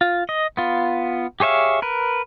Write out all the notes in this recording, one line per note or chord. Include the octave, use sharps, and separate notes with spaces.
F4
D#5
B3 F4
G4 G#4 C#5 E5 F5
A#4 B4